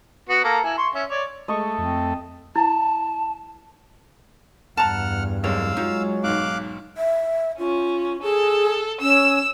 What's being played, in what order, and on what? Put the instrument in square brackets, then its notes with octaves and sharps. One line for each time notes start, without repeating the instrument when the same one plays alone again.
[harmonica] B3 F#4
A#3 A4 A#5
E4 G#5
C6 C#6
C#4 E5
C#5 D5
[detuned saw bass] G#3 [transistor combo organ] A3 [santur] D#5 C#6
[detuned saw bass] F2 [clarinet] C4
[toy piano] E4 [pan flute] A5
[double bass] E2 G2 [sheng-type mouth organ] F#5 F6 [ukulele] A5 A#5
[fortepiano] C2 F#2 G#3 [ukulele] C#5 [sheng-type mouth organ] F5 E6
[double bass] F#3 G#3 [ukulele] D#4 [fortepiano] F4
[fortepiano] B1 G#2 [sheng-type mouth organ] F5 D6 F#6
[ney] E5
[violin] C#4 [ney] F4
[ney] G#4 [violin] A4
[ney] C#4 [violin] E6 E7